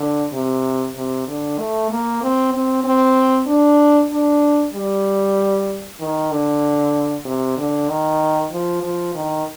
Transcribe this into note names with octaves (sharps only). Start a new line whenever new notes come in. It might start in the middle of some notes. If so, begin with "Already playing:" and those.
Already playing: D3
C3
C3
D3
A3
A#3
C4
C4
C4
D4
D4
G3
D#3
D3
C3
D3
D#3
F3
F3
D#3